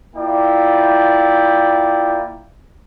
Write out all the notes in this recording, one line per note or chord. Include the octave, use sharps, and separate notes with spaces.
A#3 E4 F4 D5 G5